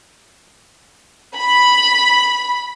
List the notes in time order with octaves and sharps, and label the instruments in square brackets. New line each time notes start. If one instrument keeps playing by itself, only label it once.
[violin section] B5